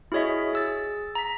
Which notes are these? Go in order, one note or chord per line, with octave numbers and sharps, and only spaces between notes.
E4 F#4 G#4 C#5 D#5 E5
G#4 E6 A6
A#5 B6